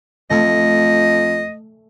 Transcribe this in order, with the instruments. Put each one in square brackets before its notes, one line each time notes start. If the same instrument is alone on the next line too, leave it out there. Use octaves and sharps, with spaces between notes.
[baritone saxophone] F2 [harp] A3 [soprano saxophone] D#5